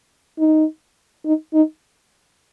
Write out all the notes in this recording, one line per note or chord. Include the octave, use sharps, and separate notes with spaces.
D#4
D#4
D#4